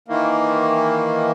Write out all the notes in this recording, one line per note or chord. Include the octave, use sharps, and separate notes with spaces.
D#3 E3 A#3